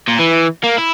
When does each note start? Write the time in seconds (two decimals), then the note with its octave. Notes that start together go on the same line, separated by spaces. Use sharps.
0.08 A#2
0.20 E3
0.64 A#3
0.78 E4